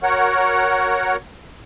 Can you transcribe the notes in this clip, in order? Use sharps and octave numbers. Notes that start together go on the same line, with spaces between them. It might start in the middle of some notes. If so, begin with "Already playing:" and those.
F#4 A#4 C#5 F#5